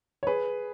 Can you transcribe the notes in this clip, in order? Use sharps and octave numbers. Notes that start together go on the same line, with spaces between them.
C#5
G#4 B4